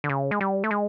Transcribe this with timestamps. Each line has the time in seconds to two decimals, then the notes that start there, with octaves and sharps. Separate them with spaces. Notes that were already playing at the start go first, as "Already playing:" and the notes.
0.04 D3
0.09 C#3
0.31 G#3
0.41 G3
0.64 A3
0.71 G#3